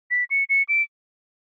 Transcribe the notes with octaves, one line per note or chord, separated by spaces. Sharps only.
B6
C#7
C#7
D7